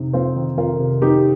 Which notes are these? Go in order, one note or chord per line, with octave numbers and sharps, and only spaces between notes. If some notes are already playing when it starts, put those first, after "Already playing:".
Already playing: F2 C3 D#4
F2 C4 F4
D#3
F2 F4 A#4
C3
F2 D#4 G4